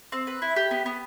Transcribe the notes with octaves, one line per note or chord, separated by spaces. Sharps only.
C4
B4
E4
G4
B3
B3